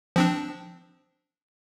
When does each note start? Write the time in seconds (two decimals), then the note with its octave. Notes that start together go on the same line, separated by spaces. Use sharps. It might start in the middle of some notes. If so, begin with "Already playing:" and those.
0.16 F3 C4 D4